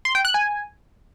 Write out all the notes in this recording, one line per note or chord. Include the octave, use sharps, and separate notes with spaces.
C6
G5
F#6
G#5